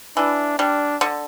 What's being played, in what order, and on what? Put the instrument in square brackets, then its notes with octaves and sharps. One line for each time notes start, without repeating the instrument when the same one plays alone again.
[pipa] E3 [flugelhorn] D4
[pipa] G3 [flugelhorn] D4
[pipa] D3